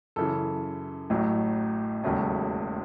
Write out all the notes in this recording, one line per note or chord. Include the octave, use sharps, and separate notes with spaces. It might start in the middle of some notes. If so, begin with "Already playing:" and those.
F#2 C#3 E3 A4
A1 A2 F#3
E1 D#2 C#3 F#3 A3